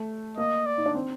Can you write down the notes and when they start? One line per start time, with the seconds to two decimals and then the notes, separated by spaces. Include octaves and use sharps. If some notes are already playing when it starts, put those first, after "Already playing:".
Already playing: A3
0.37 A#3 D#5
0.66 D5
0.78 D#4
0.86 D4
0.95 C4